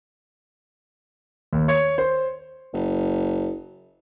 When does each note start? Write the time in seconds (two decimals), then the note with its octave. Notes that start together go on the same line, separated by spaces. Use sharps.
1.53 D#2
1.68 C#5
1.98 C5
2.74 F#1